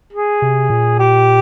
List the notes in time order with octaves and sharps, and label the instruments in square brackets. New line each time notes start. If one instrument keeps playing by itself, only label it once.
[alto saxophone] G#4
[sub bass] C3
A#2
[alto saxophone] G4